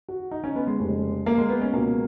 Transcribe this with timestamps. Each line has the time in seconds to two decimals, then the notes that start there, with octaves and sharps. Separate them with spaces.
0.09 F#4
0.31 D#4
0.44 C#4
0.56 B3
0.67 G#3
0.79 F1 D#2 C#3
1.26 A#3
1.38 G#3
1.49 B3
1.62 C#4
1.73 C#2 B2 A#3